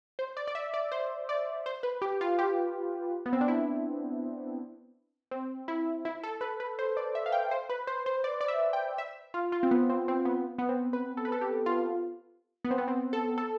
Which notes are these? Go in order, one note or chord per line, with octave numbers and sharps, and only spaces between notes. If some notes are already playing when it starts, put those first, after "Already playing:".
C5
D5
D5
E5
D5
C5
D5
C5
B4
G4
F4
G4
B3
C4
D4
E4
C4
E4
E4
A4
B4
B4
C5
D5
E5
F5
G5
C5
B4
C5
C5
D5
D5
E5
G5
E5
F4
F4
C4
B3
C4
C4
B3
B3
C4
B4
A4
B4
A4
G4
F4
B3
C4
B3
C4
A4
A4